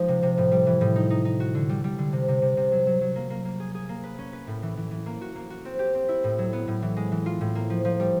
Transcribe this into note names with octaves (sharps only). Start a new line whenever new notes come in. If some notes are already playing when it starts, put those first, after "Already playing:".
Already playing: F3 G#3 D#4
C3
C3
A2
G3
E3
A2
D#4
D#4
D#4
F#4
D3
G3
G3
D3
C3
C3
C3
C3
F#3
F#3
F#3
A#3
A#3
A#3
G#4
G#4
A#3
B4
C#4
B4
A2
E3
E3
E3
A#3
F#4
A#3
F#4
C4
G4
C4
E4
A2
F#3
B3
A2
E3
G#3
E3
F4
A2
A#3
F3
F3
G3